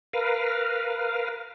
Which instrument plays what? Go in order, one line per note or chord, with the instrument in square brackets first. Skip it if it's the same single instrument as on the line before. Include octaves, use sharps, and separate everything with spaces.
[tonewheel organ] A#4 B4 F5